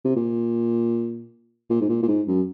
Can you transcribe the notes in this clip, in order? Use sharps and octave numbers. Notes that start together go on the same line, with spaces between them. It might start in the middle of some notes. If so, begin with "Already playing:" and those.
C3
A#2
A#2
G#2
A#2
A#2
G#2
F#2